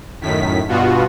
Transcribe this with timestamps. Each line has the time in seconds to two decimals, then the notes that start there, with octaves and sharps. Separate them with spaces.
0.21 F#2 A2 D#3 B6
0.68 G2 B2 B3 F4 F#4